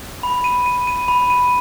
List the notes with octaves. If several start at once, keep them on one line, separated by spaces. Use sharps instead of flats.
B5
D#7
D#7
D#7
B5
D#7